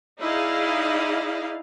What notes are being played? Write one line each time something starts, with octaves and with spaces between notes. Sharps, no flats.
D#4 E4 G#4 D5 D#5 F5